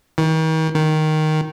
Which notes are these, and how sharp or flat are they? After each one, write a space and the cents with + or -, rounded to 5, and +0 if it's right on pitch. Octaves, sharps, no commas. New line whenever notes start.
D#3 +40
D#3 +0